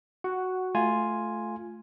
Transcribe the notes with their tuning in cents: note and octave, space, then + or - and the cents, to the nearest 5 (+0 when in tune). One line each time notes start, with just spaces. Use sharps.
F#4 +0 F#5 +10
A3 -15 F4 +0 G#5 +0